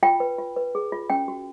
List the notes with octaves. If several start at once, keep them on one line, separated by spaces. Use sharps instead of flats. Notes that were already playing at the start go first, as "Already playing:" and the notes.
F4 G5
B4
F4
B4
G#4
F4
C#4 G5
F#4